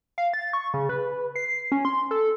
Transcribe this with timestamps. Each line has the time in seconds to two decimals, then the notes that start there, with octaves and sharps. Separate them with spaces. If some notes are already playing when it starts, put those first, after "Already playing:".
0.18 F5
0.33 A6
0.53 C#6
0.74 C#3
0.89 B4
1.36 C7
1.72 C#4
1.85 C6
2.11 A4